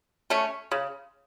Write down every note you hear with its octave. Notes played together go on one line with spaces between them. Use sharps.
A3 C#4
C#3